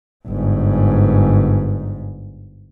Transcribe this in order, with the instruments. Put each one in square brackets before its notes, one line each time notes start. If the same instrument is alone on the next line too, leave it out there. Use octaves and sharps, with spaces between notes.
[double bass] G1 G#2